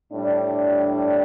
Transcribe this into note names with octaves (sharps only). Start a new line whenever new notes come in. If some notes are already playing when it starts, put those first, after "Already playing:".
A2 G3 D4